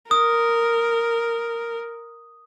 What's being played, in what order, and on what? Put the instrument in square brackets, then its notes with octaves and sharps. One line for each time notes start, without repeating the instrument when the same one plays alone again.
[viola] A#4 [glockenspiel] D#6